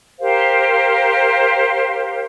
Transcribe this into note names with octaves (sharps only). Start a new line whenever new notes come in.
G4 A#4 C5 F5